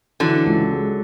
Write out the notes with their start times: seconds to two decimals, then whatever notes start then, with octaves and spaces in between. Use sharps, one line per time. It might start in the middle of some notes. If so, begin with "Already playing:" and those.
0.20 D3 E3 F#3
0.46 C#2
0.72 G#3